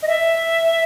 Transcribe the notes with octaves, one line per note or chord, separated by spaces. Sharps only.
D#5
E5